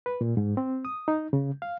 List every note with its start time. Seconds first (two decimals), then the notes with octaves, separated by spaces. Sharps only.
0.06 B4
0.21 A#2
0.37 G#2
0.57 C4
0.85 D#6
1.08 D#4
1.33 C#3
1.62 F5